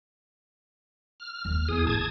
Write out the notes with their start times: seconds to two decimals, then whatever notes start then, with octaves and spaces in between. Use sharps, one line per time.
1.20 F6
1.45 D#2
1.69 E2 G#4 D#6
1.87 A1 A3 A5 D#6 G#6